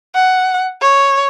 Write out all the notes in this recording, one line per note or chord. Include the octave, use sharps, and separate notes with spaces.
F#5
C#5